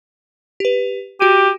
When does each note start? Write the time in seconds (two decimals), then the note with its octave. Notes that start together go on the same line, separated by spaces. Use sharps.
0.60 G4 B4
1.20 F#4 G4 D7 D#7